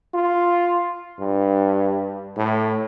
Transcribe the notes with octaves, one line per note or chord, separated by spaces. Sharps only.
F4
G2
A2